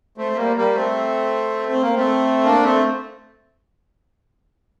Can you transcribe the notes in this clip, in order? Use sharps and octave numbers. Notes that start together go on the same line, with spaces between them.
A3 C4
A3
G3 A#3
G3 A#3
A3 C4
C4
A#3
A3 C4
A#3 D4
A3 C4